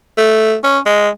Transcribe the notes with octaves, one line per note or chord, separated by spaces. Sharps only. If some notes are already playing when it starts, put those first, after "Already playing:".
A3
C#4
G#3